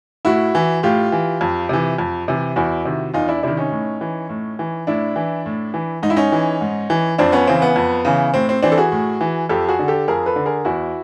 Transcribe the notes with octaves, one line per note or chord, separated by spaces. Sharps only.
A2 E4 F#4
E3
A2 F4 G4
E3
F2
C3 E3
F2
C3 E3
E2 E4 F#4
C3 D#3
E2 D#4 F4
D4 E4
C3 D#3 D4 E4
C#4 D#4
A2
E3
A2
E3
A2 D4 E4
E3
A2
E3
G#2 D#4
E4
C#4 D#4
E3
G#2
E3
F2 C4 D4
B3 C#4
C#3 E3 C4
B3
F2
C#3 E3
A2 C4
C4
E3 C4 D4
A4
F#4 G#4
A2
E3
F2 G4 A4
F#4 G#4
D3
G4 A4
F2 G#4 A#4
A4 B4
D3
G#4 A#4
E2 E4 F#4